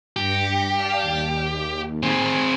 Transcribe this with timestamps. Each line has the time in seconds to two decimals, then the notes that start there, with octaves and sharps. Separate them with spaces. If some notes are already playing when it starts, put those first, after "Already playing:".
0.16 G2 G4 A#6 C#7
0.73 D5 F5 A5
1.02 D#2
2.03 C4 G#4 G#5 B5 G#6